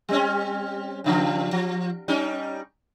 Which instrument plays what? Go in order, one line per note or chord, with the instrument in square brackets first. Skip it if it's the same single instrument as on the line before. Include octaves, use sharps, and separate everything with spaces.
[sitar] G3 C4 C#4
G2 C#3 F3
F3
G3 C#4 D#4